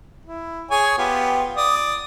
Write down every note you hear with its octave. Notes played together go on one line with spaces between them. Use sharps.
E4
G#4 C#5 G#5
B3 F4 G4
D5 D#6